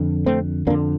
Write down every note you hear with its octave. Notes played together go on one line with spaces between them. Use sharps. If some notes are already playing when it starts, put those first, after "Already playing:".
Already playing: F2 D3
A3 C4
F2 D3 A#3 D4